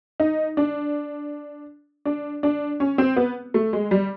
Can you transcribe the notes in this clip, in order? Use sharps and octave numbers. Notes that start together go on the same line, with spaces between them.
D#4
D4
D4
D4
C#4
C4
B3
A3
G#3
G3